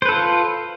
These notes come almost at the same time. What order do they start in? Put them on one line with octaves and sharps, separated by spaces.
C5 B4 A4 F4